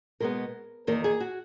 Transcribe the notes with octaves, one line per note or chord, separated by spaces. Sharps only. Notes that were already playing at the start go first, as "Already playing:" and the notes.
B2 G#3 B3 A#4
E2 D#3 A#3 A#4
G#4
F#4